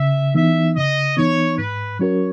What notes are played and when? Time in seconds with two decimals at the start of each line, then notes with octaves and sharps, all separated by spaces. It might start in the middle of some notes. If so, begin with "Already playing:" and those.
Already playing: C#3 E5
0.34 E3 B3 D#4 E5
0.76 C#3 D#5
1.17 E3 B3 D#4 C#5
1.58 G#2 B4
1.99 F#3 C#4 F#4 A#4 C#5